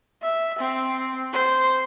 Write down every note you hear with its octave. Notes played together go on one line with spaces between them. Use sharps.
E5
C4
C5